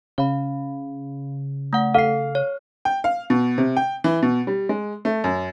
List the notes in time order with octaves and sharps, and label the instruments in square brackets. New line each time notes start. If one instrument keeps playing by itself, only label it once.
[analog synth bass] C#3 [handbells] F5 B5
[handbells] A3 F#5
[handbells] A4 C7 [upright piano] F5
[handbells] C#5
[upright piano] G5
F5
B2
C3
G5
E3
B2
G3
G#3
A3
F#2